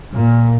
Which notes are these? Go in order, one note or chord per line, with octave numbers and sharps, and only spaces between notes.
A#2